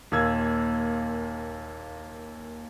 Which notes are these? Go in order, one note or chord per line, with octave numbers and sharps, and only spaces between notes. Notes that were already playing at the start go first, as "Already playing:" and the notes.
D#2 A#2 A#3 E6 G#6